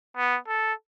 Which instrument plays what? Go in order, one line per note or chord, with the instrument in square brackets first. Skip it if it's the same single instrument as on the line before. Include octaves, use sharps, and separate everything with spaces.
[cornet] B3
A4